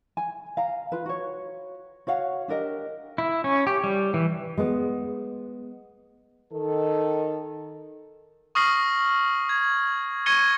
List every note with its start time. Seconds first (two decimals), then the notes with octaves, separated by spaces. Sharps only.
0.17 G#5
0.57 F5 A#5
0.92 F4 B4
1.06 F#4 C#5
2.07 F#4 C#5 F5 F#5
2.48 D4 G4 A#4 D#5
3.18 E4
3.44 C#4
3.67 G4
3.84 G3
4.14 E3
4.58 G#3 B3
6.52 D#3 A4
8.55 C#6 D#6 F6 A#6 C7 F#7
9.49 G#6
10.26 C#6 G#6 A#6 C#7 D#7 G7